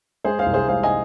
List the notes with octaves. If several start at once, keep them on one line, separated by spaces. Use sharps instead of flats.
G#3 G#4 C5
C5 F5
C2
G#4 C5
G#3 C5 F5
D#5 G#5